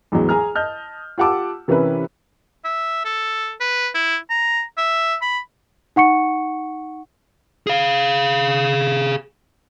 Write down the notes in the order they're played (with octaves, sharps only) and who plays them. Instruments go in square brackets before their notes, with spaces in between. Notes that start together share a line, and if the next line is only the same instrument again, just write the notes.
[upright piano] A1 E2 E3 F#3 G#3
G#4 G#5 A#5 F6
D#5 A5 F6 G6
F4 G4 F#5 A5 D6 E6
C3 E3 C#4 E4 A#4 B4
[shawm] E5
A4
B4
E4
A#5
E5
B5
[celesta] D#4 F#5 C#6 C#7
[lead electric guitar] G#4 F5